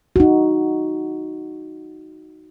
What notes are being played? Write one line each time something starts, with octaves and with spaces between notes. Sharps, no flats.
D#4 F#4